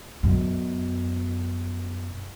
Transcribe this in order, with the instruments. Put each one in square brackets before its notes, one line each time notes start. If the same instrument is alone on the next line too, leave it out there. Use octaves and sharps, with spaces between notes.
[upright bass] F#2 B2